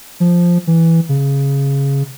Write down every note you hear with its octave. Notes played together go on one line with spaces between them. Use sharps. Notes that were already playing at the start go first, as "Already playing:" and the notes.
F3
E3
C#3